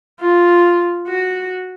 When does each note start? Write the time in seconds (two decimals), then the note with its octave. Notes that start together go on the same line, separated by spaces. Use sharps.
0.21 F4
1.07 F#4